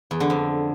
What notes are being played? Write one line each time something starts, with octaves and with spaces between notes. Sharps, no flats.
E2
D3
F2